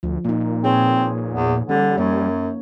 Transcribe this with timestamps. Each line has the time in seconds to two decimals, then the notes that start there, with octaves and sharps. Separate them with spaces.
0.03 D2 F3
0.24 A#2 A#3 D#4
0.64 C4 G#4 B4 C#5
1.32 E2
1.69 D3 G3 C#4
1.97 F#2 A#3 C#5